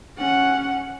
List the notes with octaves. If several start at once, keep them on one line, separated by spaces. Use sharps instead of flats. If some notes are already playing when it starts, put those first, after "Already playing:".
C#4 F#5